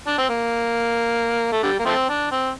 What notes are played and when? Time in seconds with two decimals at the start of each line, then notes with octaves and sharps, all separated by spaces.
0.07 D4
0.18 C4
0.30 A#3
1.52 A3
1.63 D3 G3
1.79 A#3
1.86 F3 A3 C4
2.09 D4
2.31 C4